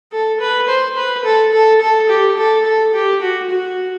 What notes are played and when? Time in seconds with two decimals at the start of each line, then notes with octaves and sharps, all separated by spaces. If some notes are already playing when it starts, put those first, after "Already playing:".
0.12 A4
0.40 B4
0.68 C5
0.96 B4
1.25 A4
1.53 A4
1.81 A4
2.09 G4
2.37 A4
2.65 A4
2.94 G4
3.22 F#4
3.50 F#4